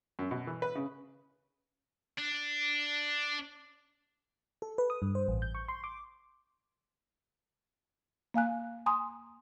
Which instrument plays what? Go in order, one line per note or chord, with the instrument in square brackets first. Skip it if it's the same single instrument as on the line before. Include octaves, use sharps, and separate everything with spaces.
[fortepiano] F#2
B2
E3
B4
C#3
[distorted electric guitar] D4
[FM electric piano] A4
B4
D#6
G2
C5
A1
G6
C#6
C6
D6
[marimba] A#3 F5 G#5 F#6
G#5 A#5 C6 D#6